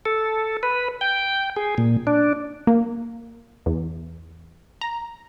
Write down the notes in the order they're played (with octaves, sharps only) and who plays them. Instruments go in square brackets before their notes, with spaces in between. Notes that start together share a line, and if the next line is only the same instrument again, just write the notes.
[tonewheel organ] A4
B4
G5
G#4
A#2
D4
[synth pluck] A#3
E2
A#5